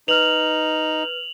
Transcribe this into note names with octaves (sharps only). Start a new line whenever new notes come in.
D#4 B4 F6 F7 F#7